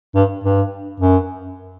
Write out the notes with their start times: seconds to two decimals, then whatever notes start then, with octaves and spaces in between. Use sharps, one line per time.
0.15 G2
0.44 G2
1.00 F#2